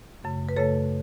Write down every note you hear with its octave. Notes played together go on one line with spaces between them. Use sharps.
F#2 C#3 A3
B4
F#2 C#3 A3 A4 C#5